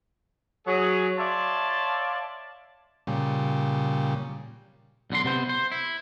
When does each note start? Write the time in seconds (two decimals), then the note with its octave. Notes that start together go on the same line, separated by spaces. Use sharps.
0.67 F#3 G#4
1.19 C#5 D5 E5 F5 A5 C6
3.07 A#2 C#3 G3
5.10 B1 D3 C6
5.25 C3 B3 C5
5.49 C5
5.72 E4